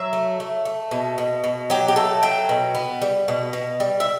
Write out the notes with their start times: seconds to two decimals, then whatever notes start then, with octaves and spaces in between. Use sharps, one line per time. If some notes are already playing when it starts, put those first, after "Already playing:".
Already playing: F#3 E5
0.13 A3
0.40 A3
0.65 A3
0.91 B2
1.18 B2
1.44 B2
1.70 F#3 G4
1.88 G4
1.96 A3 A4
2.23 F#3 G5
2.49 B2
2.75 B3
3.02 G3
3.28 B2
3.53 B2
3.80 G3
4.00 E5